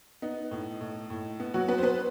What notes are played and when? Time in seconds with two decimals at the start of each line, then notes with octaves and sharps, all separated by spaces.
0.22 B3 D#4
0.51 A2
0.80 A2
1.10 A2
1.40 B3
1.54 F#3 F#4
1.68 B3 B4
1.78 C5
1.83 B3 B4